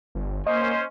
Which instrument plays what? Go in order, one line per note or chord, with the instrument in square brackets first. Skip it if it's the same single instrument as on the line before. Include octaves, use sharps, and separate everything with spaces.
[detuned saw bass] G1
[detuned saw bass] A#3 [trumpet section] C#4 C5 [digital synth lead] D#5